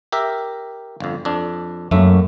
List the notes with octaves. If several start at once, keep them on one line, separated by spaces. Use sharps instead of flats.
G4 A#4 E5
G1 F2
F2 D4
F#2 A3 A#3 E5